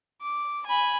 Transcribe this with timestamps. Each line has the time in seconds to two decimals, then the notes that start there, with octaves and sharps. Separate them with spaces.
0.22 D6
0.66 G#5 B5